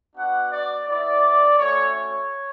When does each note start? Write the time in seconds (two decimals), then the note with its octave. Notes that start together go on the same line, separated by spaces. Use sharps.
0.16 B3 D4 F#4 F#5
0.51 D5
0.88 B3 E4 D5
1.58 A3 C#4 F#4 C#5
1.93 C#5